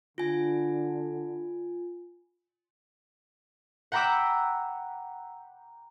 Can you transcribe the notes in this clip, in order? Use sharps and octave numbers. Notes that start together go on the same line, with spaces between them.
D3 F4 G#5
F#5 G5 A#5 B5 D6 E6